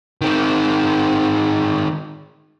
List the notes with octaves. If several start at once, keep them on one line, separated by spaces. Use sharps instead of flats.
D#3 C4